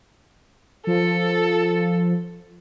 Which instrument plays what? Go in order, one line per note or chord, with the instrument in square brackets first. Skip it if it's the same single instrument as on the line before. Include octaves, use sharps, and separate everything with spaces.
[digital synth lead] F3 [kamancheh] A4